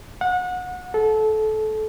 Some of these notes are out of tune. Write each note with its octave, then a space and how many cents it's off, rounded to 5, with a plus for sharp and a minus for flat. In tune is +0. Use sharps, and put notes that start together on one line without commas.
F#5 -30
A4 -25